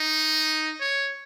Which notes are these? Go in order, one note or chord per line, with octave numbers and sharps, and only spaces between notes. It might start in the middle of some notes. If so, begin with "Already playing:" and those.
Already playing: D#4
C#5